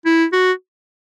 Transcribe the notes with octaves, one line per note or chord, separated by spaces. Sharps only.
E4
F#4